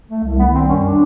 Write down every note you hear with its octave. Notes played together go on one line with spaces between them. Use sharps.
A3
C2
D#3 B3
G3 C4
F#2 C#4
D4